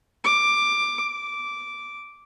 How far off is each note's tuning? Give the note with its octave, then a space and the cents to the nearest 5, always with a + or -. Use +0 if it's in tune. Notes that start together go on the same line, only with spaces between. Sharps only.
D6 +10
D6 -5